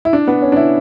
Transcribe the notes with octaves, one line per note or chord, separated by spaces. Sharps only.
E4
D4
B3
C#4
D4
E4